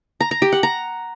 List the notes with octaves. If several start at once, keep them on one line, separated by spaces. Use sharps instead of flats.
A#5
A#5
G4
F#5
A#5